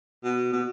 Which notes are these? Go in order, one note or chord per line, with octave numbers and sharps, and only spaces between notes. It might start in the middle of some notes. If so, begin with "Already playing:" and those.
B2
B2